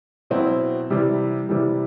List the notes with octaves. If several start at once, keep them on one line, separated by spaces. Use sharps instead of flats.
B2 F#3 C4 E4
C3 E3 G3
C3 E3 G3